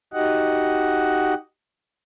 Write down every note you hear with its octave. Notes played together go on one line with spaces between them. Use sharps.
D#4 F#4 G4 D#5 F#5